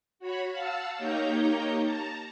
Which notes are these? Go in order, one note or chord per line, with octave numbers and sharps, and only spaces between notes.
F#4 C#5 B5
F5 F#5 A5 E6
A#3 D#4 G4 C#5 A#5 G6
A5 A#5